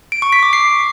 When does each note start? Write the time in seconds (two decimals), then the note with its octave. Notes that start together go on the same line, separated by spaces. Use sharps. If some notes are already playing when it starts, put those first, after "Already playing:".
0.12 D7
0.22 C#6
0.32 B6
0.43 D6
0.53 C7